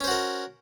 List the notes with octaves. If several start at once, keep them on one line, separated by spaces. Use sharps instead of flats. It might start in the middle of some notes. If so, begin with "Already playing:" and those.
C#4 F#4 A#4 C5